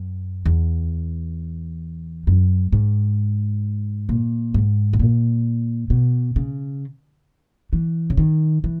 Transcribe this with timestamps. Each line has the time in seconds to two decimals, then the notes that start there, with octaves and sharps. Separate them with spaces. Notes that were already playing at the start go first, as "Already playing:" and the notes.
Already playing: F#2
0.46 E2
2.27 F#2
2.72 G#2
4.09 A#2
4.54 G#2
4.93 B2
5.00 A#2
5.90 B2
6.36 C#3
7.73 E3
8.10 C#3
8.17 D#3
8.64 E3